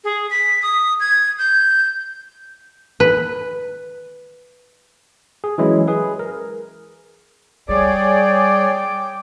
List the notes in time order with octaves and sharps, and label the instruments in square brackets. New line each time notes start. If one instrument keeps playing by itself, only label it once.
[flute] G#4
B6
D#6
G#6
G6
[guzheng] B4
[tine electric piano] G#4
E3 F#3 G#3 C#4 E4 G#4
G#4 B4
A#4
[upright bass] G3 [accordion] G#4 C#5 D5 [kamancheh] G5 D6